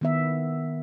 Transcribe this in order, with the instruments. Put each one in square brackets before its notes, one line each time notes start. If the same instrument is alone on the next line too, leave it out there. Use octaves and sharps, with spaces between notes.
[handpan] D#3 B3 E5